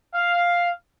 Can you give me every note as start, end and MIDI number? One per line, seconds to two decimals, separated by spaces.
0.15 0.70 77